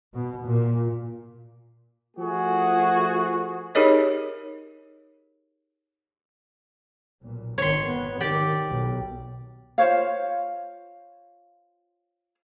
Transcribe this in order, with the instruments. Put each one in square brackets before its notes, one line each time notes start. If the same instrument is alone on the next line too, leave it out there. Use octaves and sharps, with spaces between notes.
[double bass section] B2
A#2
[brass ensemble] F3 A3 F#4 G#4
[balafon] D#4 G4 G#4 A#4 C#5 D#5
[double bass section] B1 A#2
[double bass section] G#1 D#3 [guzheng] C#5 C6
[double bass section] B3
[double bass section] D#3 [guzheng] G4 D5
[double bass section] B1 B2
[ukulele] F4 C5 C#5 F5